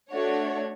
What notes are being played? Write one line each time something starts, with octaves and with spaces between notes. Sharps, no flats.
A3 D4 F#4 C#5